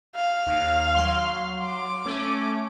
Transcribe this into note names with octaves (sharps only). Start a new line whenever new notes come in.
F5
D#2
F#3 C6
D6
A3 C#4